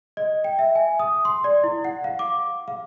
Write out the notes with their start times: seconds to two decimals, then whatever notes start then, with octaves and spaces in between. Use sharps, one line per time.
0.17 D#5
0.44 G5
0.59 E5
0.75 G#5
0.99 D#6
1.25 C6
1.44 D5
1.64 E4
1.85 F#5
2.04 F5
2.19 D6
2.68 F5